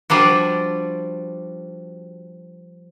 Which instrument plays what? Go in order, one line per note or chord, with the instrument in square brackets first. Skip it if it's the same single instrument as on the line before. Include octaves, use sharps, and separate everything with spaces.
[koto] F3 G3 D4 F#4